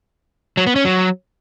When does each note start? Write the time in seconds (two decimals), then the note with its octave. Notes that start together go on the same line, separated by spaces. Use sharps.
0.57 F#3
0.67 B3
0.76 C#4
0.85 F#3